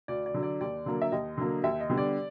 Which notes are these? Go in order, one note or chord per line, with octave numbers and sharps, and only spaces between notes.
D2 D5
D5
D3 F#3
D5
D#2 D5
D3 F#3 A#3
E5
D#2 D#5
D3 F#3 A#3
D#2 E5
D#5
D3 G3 B3
D5